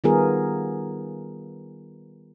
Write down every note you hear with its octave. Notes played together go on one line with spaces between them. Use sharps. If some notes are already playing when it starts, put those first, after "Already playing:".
D#3 G3 B3 F4 G#4 A#4